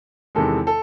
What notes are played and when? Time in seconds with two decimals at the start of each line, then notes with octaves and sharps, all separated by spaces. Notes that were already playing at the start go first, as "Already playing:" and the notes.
0.35 E2 C3 D#3 G#3 A4
0.67 A4